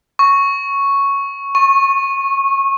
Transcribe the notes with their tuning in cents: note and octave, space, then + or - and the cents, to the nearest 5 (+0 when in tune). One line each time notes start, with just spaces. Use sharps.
C#6 +0
C#6 -25